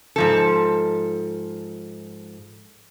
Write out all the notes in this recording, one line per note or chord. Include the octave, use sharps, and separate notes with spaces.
G#2 F3 A4